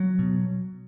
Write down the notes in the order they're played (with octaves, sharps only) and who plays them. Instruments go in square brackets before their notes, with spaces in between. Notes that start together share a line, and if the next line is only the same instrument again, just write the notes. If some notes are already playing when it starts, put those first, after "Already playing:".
Already playing: [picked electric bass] F#3
B2